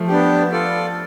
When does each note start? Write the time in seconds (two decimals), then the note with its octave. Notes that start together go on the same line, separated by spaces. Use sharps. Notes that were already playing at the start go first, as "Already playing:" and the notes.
Already playing: F3 A3
0.08 B3 D4 G4
0.51 F4 A4 D5